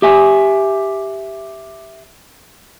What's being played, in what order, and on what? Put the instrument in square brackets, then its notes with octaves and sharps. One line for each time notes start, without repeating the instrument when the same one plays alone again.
[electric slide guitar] G4 E5 G#5